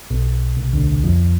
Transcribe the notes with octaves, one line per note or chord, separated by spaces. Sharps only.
B1 B2
C2 C3
D2 D3
F2 F3